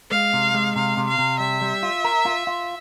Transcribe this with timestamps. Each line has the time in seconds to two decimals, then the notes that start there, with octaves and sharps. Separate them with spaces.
0.11 G#3 F5
0.33 C3
0.54 G#3
0.76 C3 F5
0.97 C3
1.08 F5
1.18 C3
1.40 G3 E5
1.62 G3
1.83 F4
2.04 A#4
2.25 F4
2.47 F4